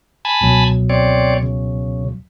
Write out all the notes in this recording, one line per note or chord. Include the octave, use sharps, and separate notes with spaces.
G#5 A5 B5
C#2 B2 F#3
C4 C#5 D5
C#3